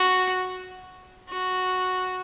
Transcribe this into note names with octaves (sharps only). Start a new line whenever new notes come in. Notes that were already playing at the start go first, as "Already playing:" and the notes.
Already playing: F#4
F#4